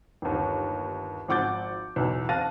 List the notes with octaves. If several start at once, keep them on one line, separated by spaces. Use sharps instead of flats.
G1 D#2
G#1 F3 F#5 D6 G6 A6
B1 E2 E3
F5 A5 F#6 A6 A#6 D#7